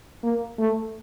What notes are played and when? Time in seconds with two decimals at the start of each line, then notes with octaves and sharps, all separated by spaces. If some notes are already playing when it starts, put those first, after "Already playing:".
0.23 A#3
0.59 A3